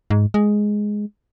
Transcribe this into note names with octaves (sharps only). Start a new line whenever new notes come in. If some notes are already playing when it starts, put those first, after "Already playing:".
G#2
G#3